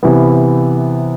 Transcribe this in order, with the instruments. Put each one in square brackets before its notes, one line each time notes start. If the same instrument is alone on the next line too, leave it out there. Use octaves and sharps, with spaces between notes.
[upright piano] C3 E3 B3